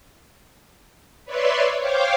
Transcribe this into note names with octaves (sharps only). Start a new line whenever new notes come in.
B4 C#5 D5 E5 C6
C5 C#5 F5 G5 D6